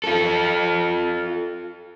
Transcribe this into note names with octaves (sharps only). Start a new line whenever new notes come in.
F4 A4